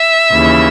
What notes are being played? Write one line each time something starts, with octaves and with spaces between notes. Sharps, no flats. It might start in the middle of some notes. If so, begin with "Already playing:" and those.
Already playing: E5
D#2 C#3 E3